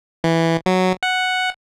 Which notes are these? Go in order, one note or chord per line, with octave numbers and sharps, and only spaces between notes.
E3
F#3
F#5